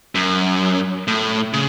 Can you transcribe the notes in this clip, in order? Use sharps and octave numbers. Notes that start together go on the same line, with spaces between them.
F#2
A2
C#3